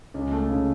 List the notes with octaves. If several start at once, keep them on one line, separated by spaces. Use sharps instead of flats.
C#2
A3
C#3